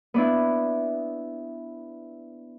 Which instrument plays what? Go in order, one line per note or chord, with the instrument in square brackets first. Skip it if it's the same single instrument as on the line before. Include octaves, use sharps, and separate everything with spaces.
[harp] B3 D4 E4